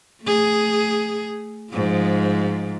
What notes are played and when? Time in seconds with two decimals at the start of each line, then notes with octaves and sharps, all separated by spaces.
0.23 A3 G#4
1.72 G#2 F3